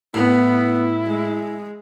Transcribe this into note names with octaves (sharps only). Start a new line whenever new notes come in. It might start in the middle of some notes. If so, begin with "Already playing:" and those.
A2 B3 E4
G#3